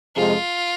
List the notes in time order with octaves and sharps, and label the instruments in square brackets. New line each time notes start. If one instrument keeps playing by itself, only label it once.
[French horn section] F2 C3 F3 G#3 [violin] F4